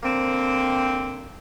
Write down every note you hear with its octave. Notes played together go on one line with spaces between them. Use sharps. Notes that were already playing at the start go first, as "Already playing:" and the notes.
D3 A#3 C4